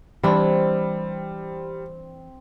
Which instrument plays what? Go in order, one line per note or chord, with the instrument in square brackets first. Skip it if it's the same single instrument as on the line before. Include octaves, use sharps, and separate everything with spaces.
[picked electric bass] E3 [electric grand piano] G3 [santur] C4 C5 [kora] D4 E4